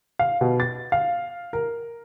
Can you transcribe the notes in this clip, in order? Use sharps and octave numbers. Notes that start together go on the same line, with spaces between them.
F5
B2
A6
F5
A#4